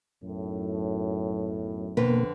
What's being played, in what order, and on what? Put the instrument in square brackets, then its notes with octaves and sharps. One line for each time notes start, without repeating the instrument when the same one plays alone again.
[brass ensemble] B1 F#2 A2
[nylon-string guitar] F2 D3 B4 [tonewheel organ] B2 A#3